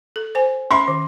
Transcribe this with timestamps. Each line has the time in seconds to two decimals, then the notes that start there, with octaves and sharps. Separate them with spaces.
0.16 A4
0.35 C5 G#5
0.71 C#4 E5 B5 C6
0.88 D#3